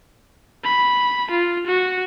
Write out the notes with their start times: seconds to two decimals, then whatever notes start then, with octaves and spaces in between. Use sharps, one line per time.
0.64 B5
1.31 F4
1.66 F#4